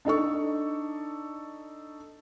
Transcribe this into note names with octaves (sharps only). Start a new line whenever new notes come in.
D4 D#4 A4 C#6